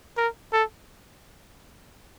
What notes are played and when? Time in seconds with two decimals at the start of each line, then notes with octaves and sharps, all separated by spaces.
0.17 A#4
0.53 A4